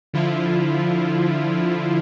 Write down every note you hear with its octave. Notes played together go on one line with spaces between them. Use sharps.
D3 F3 E4 F4